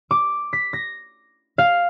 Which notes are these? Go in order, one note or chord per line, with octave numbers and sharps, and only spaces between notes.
D6
B6
A#6
F5